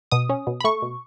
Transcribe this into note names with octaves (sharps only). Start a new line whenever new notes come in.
B2 D#6
C#4
B2
B5
A3 C#6
B2